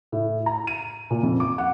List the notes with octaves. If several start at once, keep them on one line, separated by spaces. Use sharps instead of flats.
A2
A#5
D#7
A#2
F2
D6
F#5